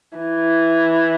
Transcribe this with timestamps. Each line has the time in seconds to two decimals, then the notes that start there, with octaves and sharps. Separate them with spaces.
0.17 E3